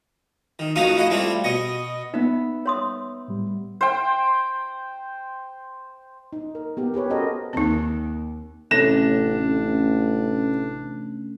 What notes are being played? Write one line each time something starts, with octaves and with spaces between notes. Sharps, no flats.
D#3
F2 A3 D#4 F#4 F5 D#6
E4 F#4 D#5
G3 A3 C4 E4 F4
B2 D#5 C#6
B3 D#4 E5
C#5 C6 D#6
A2 G3
C5 G5
D#4
A#4
B3 G4 A#4
G4 G#4 B4 C#5
C#4 F#4 A4 A#4 C5 D#5
D#2 C4 D#4
A1 C3 A3 C#4 D4 A#6 E7